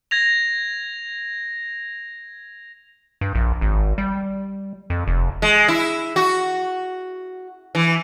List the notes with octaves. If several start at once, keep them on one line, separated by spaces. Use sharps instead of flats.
G#6 A#6 F7
G2
A#1
G#1
G3
F2
F1
G#3
E4
F#4
E3